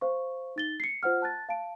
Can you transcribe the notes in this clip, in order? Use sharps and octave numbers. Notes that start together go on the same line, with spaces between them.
C5 F5 C#6
D#4 A6 G7
C7 C#7
F4 C5 F#5 F6
A5 F#6 A6
F5 A5 D7